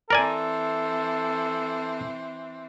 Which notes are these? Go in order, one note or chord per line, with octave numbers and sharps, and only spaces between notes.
E3 C4 A4 A#4 D5 G#5